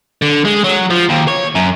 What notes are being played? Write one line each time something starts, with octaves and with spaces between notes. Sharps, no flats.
D3
G#3
F#3
F3
D#2
C#5
F#2